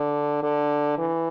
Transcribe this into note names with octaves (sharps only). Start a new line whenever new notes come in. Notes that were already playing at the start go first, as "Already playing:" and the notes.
Already playing: D3
D3
E3